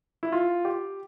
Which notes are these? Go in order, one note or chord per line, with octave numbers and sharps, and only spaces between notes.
E4
F4
G4